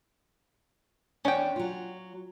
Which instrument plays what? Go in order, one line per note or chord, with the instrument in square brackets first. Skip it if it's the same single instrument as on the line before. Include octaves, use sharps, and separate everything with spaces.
[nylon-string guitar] E2 D4 [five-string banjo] C#4 G5
[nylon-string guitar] F#3 F4